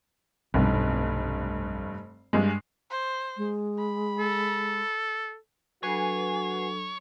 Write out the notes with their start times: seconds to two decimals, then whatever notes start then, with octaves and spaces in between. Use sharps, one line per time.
0.54 F1 B1 G2
2.33 G2 G3 G#3
2.91 C5
3.37 G#3
3.78 B5
4.19 A4
5.83 F#3 D4 F#4 A4 B4 C#5 G#5 C7